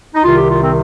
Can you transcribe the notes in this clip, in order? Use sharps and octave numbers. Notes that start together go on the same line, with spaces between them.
D#4
C2 C3 D#3 F4
G4
F4
C4